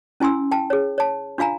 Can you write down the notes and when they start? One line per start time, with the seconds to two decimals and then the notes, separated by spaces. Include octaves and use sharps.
0.20 C#4 E4 G#5 C6 E6
0.51 G5 A5
0.70 G#4 C#5
0.98 C#5 A5
1.38 D4 F4 F5 G#5 A#5